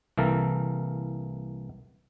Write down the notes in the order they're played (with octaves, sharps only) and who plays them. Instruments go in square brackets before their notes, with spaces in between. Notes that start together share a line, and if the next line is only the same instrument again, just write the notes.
[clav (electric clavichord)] C2 E3 A#3 A4 A#4